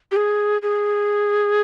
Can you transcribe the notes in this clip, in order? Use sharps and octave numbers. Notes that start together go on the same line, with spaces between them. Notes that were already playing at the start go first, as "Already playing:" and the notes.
G4
G#4
G#4